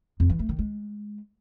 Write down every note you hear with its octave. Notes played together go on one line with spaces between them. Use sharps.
F2
E3
A3
D#3
G#3